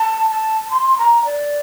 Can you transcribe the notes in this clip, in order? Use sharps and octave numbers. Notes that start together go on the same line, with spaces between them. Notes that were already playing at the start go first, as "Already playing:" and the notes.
Already playing: A5
A5
C6
A#5
D5